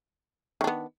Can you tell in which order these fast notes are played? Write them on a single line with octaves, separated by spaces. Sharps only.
D#3 D4 B3